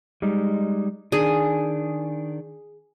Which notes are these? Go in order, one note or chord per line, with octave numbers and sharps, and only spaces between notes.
G3 G#3 D#4
D#3 D4 G#4